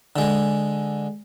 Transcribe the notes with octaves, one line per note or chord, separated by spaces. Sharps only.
D3 G#3